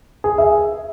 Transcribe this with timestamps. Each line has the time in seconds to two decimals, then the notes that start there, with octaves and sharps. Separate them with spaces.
0.24 G#4
0.38 E5